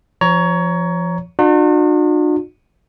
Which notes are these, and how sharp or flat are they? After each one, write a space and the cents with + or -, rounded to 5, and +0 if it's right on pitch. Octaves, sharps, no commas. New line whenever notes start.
F3 -20 C#5 +20 A#5 +5
D4 +45 F#4 -45